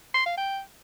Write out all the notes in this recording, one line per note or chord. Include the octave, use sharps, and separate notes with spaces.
C6
F5
G5